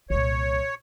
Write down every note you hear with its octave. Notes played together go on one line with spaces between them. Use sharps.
C2 A#2 C#5